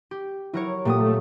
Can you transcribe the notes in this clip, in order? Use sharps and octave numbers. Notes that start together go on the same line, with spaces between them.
G4
F#3 E4 A#4 C#5
A#2 F#3 A3 A#3 G4 D#6